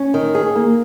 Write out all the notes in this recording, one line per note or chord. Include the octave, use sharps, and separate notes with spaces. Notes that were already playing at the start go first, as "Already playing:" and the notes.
Already playing: C#4
D#3
G#4
A#3